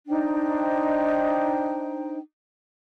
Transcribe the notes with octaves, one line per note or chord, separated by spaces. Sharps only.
D4 D#4 C5 G5